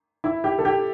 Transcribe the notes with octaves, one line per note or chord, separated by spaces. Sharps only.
E4
G4
A4
G4